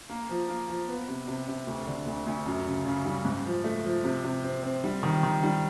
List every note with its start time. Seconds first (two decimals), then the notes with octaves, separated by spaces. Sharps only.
0.10 A#3
0.29 F3
0.48 A#3
0.68 F3
0.88 B3
1.08 C3
1.27 C3
1.48 C3
1.67 D2
1.87 D3
2.07 D2
2.26 D2
2.46 F#2
2.66 C#3
2.85 C#3
3.05 G3
3.25 G#2
3.45 F3
3.64 A3
3.84 F3
4.04 C3
4.24 C3
4.44 C4
4.63 C4
4.84 G3
5.03 D#3
5.23 D#3
5.43 G3